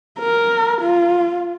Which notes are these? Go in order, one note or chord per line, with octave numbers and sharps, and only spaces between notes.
A#4
F4